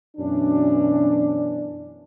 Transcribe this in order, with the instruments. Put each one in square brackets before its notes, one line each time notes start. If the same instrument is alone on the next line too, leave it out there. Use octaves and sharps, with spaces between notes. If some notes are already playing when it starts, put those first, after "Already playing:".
[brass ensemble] F#2 B2 E3 C#4 D4